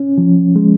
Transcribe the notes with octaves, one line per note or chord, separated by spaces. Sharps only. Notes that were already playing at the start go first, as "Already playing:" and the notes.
Already playing: C#4
F3
G#3